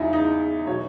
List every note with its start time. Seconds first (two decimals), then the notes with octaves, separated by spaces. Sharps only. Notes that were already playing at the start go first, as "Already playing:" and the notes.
Already playing: E2 C#3 F#3 D#4 E4
0.13 D#4
0.67 B2 F#3 C#5